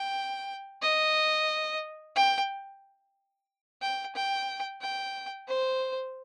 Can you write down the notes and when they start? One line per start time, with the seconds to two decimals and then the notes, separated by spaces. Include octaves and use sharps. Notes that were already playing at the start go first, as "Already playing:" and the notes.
Already playing: G5
0.82 D#5
2.16 G5
3.82 G5
4.15 G5
4.81 G5
5.48 C5